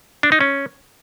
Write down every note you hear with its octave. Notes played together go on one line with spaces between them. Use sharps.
D4
D#4
C#4